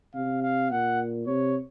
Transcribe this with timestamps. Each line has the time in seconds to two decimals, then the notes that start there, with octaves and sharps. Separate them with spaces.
0.14 C3 F5
0.43 F5
0.71 A#2 F#5
1.27 C3 C#5